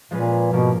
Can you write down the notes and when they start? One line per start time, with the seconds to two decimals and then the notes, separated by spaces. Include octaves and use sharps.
0.11 A#2 F3 G#3 C#4 G#4 B4
0.52 G#2 B2 F3 A#3 C#4